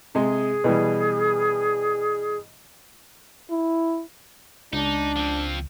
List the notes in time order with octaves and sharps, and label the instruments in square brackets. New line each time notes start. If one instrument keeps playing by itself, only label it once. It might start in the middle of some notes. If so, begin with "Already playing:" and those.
[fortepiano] C3 G#3 [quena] G#4
[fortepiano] B2 E3 G3
[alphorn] E4
[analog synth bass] C#2 [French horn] D4 [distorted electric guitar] D#4
[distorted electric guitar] F3 C4